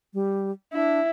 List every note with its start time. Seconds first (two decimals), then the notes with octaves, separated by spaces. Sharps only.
0.14 G3
0.73 D4 E4